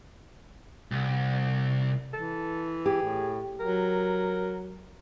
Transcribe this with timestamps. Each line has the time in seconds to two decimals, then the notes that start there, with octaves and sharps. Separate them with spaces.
0.91 C2
2.13 E3 A4
2.86 G4 G#4
3.02 A2
3.60 F#3 A#4